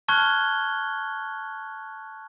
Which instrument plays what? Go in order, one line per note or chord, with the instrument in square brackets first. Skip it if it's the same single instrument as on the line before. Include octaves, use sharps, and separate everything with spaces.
[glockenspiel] A5 C#6 F6 F#6 G#6 G7